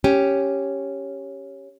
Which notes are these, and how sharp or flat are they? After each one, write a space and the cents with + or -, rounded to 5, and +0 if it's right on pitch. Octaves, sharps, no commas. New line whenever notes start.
C#4 +0 G4 +0